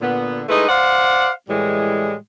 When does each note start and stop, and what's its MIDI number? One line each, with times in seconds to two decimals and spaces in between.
0.02 0.42 46
0.02 0.42 50
0.02 0.42 59
0.48 0.66 56
0.48 0.66 57
0.48 0.66 63
0.48 0.66 64
0.48 0.66 71
0.68 1.29 72
0.68 1.29 74
0.68 1.29 77
0.68 1.29 78
1.49 2.14 45
1.49 2.14 52
1.49 2.14 55
1.49 2.14 56